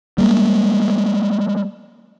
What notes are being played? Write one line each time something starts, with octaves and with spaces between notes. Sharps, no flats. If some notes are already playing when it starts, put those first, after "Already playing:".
G3 G#3 A#3